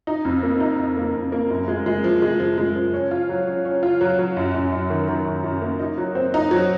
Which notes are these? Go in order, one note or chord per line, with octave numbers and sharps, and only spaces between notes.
D#4
F2
A#3
D#4
D#4
A#3
F2
A#3
F#2
G#3
G#3
F3
G#3
F3
G#3
F3
C#4
F4
F#3
C#4
C#4
F4
F#3
F#3
F#2
F#2
F#2
D#3
D#3
F#2
F#2
A#3
D#4
F#3
C4
D#4
F#3